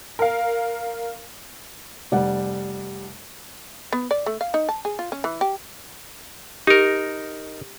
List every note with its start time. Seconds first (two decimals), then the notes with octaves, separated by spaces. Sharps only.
0.19 A#4 F5
2.12 F1 G3 D5 F#5
3.92 B3
4.11 D5
4.26 A3
4.41 F5
4.54 D#4
4.69 A5
4.85 G#4
4.99 F4
5.12 C#4
5.24 E3
5.41 G4
6.67 D#4 G4 A#4